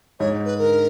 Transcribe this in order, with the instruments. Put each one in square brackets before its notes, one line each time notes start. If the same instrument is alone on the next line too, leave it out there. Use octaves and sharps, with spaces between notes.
[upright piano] G#2 [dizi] C#5
[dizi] B4
[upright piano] D3 [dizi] A#4